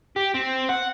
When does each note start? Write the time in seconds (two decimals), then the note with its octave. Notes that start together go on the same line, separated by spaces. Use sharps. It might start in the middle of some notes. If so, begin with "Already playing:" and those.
0.16 G4
0.35 C4
0.69 F#5